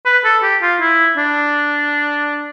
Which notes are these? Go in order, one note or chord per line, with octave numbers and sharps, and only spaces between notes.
B4
A4
G4
F4
E4
D4